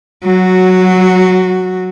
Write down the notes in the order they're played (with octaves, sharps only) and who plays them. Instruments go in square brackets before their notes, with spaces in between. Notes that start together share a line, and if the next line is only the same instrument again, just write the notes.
[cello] F#3 F#4